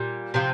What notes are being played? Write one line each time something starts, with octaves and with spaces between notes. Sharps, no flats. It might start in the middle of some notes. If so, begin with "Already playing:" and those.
Already playing: A#2 G3
C3 F3 C4